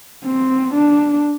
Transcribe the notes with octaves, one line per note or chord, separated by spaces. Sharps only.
C4
D4